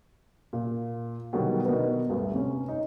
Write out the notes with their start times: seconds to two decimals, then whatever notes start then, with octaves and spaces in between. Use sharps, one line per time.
0.53 A#2
1.33 B2 D3 D#3 F#3 G3
1.65 B2 D3 D#4 A#4 B4
2.09 D2 G2
2.34 C3 C#4
2.68 D#4